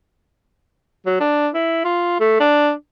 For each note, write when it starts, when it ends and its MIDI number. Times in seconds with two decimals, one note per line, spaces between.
1.06 1.17 54
1.20 1.49 62
1.54 1.80 64
1.85 2.20 65
2.20 2.36 57
2.40 2.72 62